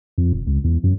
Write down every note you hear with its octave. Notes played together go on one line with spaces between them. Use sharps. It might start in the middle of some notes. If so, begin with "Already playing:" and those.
F2
E1
C#2
E2
F#2